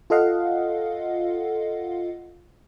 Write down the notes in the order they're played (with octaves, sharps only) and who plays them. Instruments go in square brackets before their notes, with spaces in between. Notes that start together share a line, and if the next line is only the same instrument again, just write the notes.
[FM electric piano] F4 A4 D#5 F5 F#5